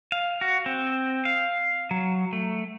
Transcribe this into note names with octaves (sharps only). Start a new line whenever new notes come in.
F5
F#4
C4
F5
F#3
A3